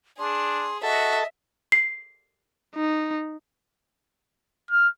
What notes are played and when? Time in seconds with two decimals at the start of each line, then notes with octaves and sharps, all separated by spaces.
0.19 D4 G#4 C6
0.83 F#4 A4 D#5 E5
1.72 C7
2.76 D#4
4.71 F6